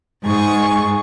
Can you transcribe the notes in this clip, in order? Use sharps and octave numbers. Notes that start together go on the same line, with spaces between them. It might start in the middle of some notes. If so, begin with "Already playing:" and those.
G#2 G#4 C#6